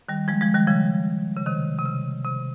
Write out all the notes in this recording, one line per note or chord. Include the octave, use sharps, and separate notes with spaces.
D#3 G3
F3 G#3
F3 G#3
D#3 G3
C#3 F3
C#3
C3 D#3
C3
C#3
C3